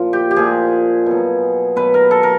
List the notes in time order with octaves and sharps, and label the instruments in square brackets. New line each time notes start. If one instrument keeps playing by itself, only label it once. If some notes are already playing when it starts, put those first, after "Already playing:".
Already playing: [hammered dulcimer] A#2 F3
G4
G4
A#2 F3 G#4
B2 F#3
B2 F#3 B4
A#4
A4
A#4